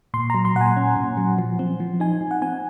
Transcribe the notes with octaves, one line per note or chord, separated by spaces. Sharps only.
A#2 C6
F#3 A#5
C6
A#2 F#5
G#5
C#4
A#2
F#3
F3
C4
F3
D#4 G#5
F3
F#5
C4 G#5